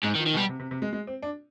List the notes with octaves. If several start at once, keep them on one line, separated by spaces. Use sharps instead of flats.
G#2 D#4
D#3
F3
D#3
B2
G3
C3
C3
C3
G#3
G#3
C4
D4